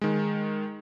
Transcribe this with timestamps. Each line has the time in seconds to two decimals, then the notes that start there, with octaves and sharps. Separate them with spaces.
0.01 D#3 G#3